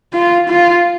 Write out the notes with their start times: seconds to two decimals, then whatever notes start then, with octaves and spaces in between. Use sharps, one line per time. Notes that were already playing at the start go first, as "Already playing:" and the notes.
0.14 F4
0.50 F4